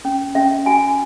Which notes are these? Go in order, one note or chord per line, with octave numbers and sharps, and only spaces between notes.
C#4
C#4 E5
F#4 G#5